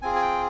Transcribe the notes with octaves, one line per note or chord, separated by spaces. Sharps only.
C4 F4 G#4 G#5
G#5
G5